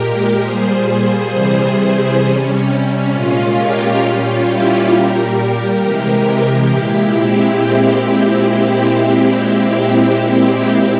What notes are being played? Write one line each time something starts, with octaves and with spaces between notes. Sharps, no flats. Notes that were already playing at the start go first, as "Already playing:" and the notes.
Already playing: A#2 G#3 G4 A#4
A#2 G3 G#4 C5
C3 E3 G3 G#4 C5
G#4 C5
C3 G3 C#4
C#4
A#2 G#3 C#4 F4
G4 A#4
A#2 G3 C#4 F4
E4 G4
A#2 G3 G4 A#4
C3 E3 G#3
A#2 G#3 E4 G4
C4